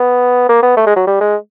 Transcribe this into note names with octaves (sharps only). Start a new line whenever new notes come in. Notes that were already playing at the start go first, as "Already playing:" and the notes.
Already playing: B3
A#3
B3
A3
G#3
F#3
G3
G#3